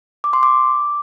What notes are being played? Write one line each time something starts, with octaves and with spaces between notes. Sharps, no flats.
D6
C6
D6